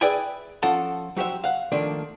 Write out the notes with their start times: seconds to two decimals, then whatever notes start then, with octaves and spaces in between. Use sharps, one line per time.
0.01 G#4 B4 D5 E5 G5 G#5
0.63 F3 C#4 F4 A4 F#5 A5
1.16 F#3 F#4 G4 C5 E5
1.44 F5 F#5
1.72 D#3 F3 A3 A#3 D4